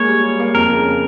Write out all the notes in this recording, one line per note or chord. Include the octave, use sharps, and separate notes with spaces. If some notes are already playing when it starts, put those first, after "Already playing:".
Already playing: G#3 A#3 C#5
G3
G3
A#3
F2 A#4
C#3